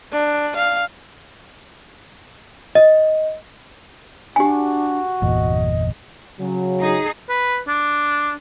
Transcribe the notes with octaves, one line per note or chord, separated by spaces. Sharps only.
D4
F5
D#5
D4 F#4 G4 G#5
G1 E2 A#2 D#5
C#3 F#3
D#4 G#4
B4
D4